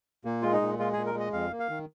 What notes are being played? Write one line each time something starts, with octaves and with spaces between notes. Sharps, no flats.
A#2 A#3
G#3 F4
D#4
A#2
G#3 F4
A#2 G#4
A#4
G#3 D#5
F2 F5
A#3
F5
D#3